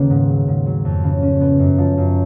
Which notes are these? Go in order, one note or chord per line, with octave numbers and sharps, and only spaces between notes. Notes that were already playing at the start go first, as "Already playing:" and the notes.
Already playing: D#2 C#3 A#3 B3
G#2
F#3
G#2
F#3
F2
C#3
C#4
B3
F#2
F3
F#2